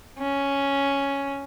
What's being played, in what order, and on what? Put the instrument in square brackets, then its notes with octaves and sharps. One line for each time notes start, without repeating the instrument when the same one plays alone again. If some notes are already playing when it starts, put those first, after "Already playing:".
[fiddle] C#4